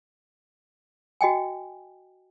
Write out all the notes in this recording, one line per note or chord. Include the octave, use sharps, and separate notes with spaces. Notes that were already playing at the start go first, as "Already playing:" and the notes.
F#4 D#5 G5 G#5